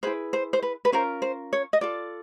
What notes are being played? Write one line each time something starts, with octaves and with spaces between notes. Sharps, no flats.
E4 G#4 B4 C5
C5
C5
B4
B4
C#4 F4 A#4 C5
C5
C#5
D#5
F4 A4 D5